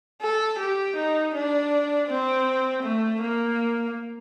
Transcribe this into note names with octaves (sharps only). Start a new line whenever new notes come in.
A4
G4
D#4
D4
C4
A3
A#3